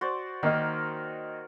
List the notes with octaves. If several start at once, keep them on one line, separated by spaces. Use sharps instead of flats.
F#4 C5 D5
D#3 A#3 D#4 A#4